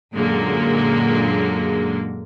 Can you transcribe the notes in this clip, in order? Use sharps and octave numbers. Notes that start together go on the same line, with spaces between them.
F#2 A#2 D3 F#3 G#3 A#3